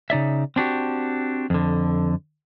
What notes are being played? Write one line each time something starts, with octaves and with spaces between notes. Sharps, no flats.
C#3 D#4 D5 E5
C4 D4 F#4 G4
F2 D3